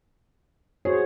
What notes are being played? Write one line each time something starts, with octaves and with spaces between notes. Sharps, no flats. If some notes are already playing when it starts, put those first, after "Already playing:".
F#4 G#4 C5 C#5